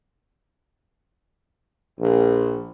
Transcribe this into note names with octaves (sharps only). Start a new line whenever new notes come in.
A#1